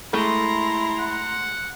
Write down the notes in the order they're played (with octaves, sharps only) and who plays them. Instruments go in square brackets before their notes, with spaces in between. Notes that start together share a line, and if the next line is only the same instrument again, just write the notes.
[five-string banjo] G#3 A3 [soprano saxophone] E4 [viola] A#5 C6
[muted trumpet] F#5